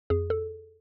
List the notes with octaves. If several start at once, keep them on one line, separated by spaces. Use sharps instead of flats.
F2 G#4
A4